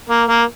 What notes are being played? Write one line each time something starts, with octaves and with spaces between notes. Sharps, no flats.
A#3
A#3